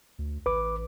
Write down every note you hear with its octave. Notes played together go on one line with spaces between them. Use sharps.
D2
A1 B4 D6